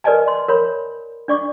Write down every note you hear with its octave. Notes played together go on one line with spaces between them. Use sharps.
A#4 B4 D5 D#5 G#5 A5
C6
A#4 C#5 B5
D4 D5 C#6 D6